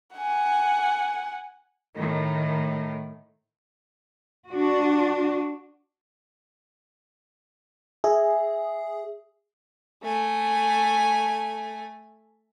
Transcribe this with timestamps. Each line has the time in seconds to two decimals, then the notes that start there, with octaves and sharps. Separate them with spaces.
0.15 F#5 G#5
1.96 A2 D#3
4.49 D4 F#4
8.04 G#4 E5
10.04 A3 G#5